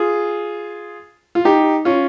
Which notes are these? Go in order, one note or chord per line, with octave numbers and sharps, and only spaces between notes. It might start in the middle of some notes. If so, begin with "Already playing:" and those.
Already playing: F4 G#4
F4
D#4 G4
C#4 F4